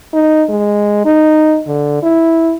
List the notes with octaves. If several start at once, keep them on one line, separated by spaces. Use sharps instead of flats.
D#4
G#3
D#4
D3
E4